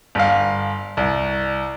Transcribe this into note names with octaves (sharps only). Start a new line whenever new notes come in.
G1 F5
C2